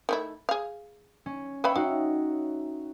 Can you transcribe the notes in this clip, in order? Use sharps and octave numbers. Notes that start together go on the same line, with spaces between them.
D#3 A3 E4
G#4 F5
C#4
B4 C#5 E5 F5 G5 B5
D#4 F#4 F5